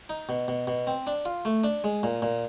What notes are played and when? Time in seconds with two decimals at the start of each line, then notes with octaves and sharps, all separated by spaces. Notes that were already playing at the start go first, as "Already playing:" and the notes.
0.09 D#4
0.29 B2
0.48 B2
0.67 B2
0.87 C4
1.07 D4
1.26 F4
1.45 A3
1.64 D4
1.84 G#3
2.03 A#2
2.22 A#2